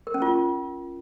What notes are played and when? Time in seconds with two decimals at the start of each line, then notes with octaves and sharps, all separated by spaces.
0.07 A#4
0.14 C#4
0.22 F4